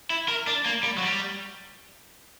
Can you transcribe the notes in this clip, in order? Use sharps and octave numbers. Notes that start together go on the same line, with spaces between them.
E4
A#4
D4
A#3
G3
F#3
G3